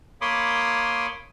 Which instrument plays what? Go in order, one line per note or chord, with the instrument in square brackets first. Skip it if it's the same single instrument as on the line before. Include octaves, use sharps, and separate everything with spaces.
[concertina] A#3 C#5 B5 C6 D6 D#6